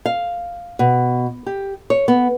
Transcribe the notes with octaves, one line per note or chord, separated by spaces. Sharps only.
F5
B2
G4
C#5
B3